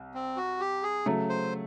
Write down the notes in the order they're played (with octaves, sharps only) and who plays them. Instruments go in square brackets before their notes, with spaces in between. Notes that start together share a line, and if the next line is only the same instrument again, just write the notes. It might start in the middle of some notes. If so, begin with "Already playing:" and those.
Already playing: [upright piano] C2
[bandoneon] C4
F#4
G4
G#4
[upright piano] C#3 F#3 A3
[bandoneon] C5